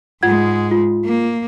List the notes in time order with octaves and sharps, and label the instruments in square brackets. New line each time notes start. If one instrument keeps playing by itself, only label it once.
[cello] G#2 G#3 [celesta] F4 F#5 G#6
[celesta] F4
[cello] A#3